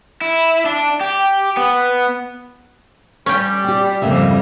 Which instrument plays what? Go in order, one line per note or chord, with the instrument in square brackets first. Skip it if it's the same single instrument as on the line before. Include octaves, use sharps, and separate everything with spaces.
[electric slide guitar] E4
D4
G4
B3
[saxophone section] G3 [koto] C#4 G5
[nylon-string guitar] C4 G4
[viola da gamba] F2 G3 A#3 [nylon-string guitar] G#2 C#3 E5